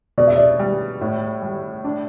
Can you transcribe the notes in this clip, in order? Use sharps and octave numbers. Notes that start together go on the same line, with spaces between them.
B2 D5
E5
D5
G3
A2
G3
D4